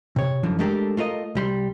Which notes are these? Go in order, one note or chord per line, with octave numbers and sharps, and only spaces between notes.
C3 C#5
F#2 D3 E3 F3
G#3 A3 D4 G4 A4 A#4
A3 F4 A#4 D#5
C2 G3 C6